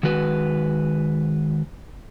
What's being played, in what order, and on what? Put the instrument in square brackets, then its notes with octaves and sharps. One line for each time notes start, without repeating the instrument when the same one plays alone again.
[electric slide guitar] D#3 G#3 F#4 B4